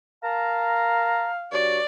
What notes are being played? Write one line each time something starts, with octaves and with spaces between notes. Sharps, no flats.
A#4 F5 A5 A#5
G2 F#4 C#5 D5